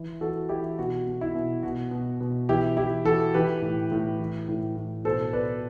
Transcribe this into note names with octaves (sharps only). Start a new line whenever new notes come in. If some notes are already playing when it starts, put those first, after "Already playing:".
Already playing: E3
E3 F#4 A4
E3 E4 G4
B2 F#4
B2
E4
B2
B2 F#4
B2
B2
E3 E4 G4
E3 E4 G4
E3 F#4 A4
E3 G4 B4
A2
A2
E3
A2
A2
B2 A4 C5
B2 B4 D5